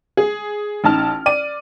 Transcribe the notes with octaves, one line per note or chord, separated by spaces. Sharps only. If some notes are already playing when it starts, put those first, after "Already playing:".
G#4
A1 D#4 A5 F6
D5 D#7